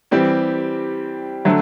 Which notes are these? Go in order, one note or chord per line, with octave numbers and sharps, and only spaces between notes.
E3 G3 C4 G4
D3 F#3 A3